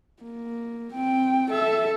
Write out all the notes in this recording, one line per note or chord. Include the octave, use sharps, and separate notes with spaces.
A#3
C4 G5
A4 E5